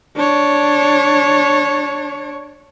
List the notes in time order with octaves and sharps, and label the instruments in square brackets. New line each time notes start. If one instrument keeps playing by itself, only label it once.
[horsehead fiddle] D4 C#5